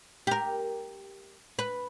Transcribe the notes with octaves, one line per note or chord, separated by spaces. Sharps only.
G4 A#4
B4